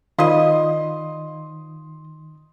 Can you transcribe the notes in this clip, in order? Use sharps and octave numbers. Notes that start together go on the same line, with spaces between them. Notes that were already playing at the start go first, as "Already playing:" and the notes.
D#3 F4 C5 D5 D#5 F5 C6 D#6